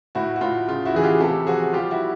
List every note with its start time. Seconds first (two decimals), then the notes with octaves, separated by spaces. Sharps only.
0.15 A2 E4 F#4
0.36 F#4
0.41 A2 F4
0.68 C#3 F4
0.85 E4 F#4
0.95 E3 G#4
1.03 F4 G4
1.20 C3 G4 A4
1.47 F3 F#4 G#4
1.73 G3 F4 G4
1.91 E4 F#4